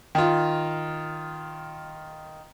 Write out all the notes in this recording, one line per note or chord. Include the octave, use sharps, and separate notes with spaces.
D#3 F4